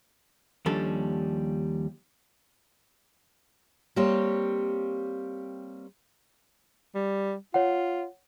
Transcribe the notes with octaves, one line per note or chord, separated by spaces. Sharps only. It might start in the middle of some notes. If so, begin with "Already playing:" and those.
D#2 F3 G3 C#4 D4 A4
G3 A#3 C4 G4 C#5
G3
F4 C#5 F#5